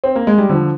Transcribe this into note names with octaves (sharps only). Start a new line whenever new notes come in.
C4
A#3
G#3
G3
D3 F3